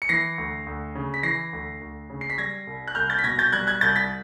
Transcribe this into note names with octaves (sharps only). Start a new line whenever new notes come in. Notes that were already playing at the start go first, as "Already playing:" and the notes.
C#7
E3 A#6 C7
D2
D2
C#3
B6
E3 A#6 C7
D2
D2
C#3
C7
B6
G3 G#6 A#6
C2
F#6
C2 F6 G6
G6 A6
B6
B2 G#6 A#6
G6 A6
G3 F#6 G#6
F#6 G#6
C2 G6 A6
A6 B6